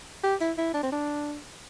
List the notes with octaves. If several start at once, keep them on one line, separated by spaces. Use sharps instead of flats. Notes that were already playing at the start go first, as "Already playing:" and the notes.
G4
E4
E4
D4
C4
D4